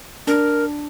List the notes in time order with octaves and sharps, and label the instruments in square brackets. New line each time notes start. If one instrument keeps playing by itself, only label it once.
[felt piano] D4 [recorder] A#4